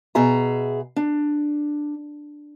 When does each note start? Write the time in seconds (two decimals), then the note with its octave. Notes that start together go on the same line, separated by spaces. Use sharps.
0.15 B2 G#4 E5 A#5
0.96 D4